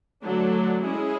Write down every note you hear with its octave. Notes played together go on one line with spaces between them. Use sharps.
D3 F#3 A3 D4
G#3 C#4 E4 G#4